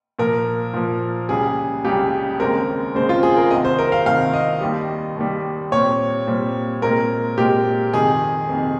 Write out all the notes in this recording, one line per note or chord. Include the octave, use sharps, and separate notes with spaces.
A#2 F3 A#3 A#4
A#2 F3 A#3
C#2 C#3 G3 G#4
C#2 C#3 G3 G4
D#2 C#3 G#3 C4 A#4
D#2 C#3 G#3 C4 C5
F4
G#4
A#4
C2 C3 D#3 D#5
C5
A#4
F5
C2 C3 D#3 F5
D#5
D#2 D#3 G3
D#2 D#3 G3
A#2 G3 C4 C#5
A#2 G3 C4
A#2 G#3 C4 A#4
A#2 G#3 C4 G4
F2 C3 D#3 G#4
F2 C3 D#3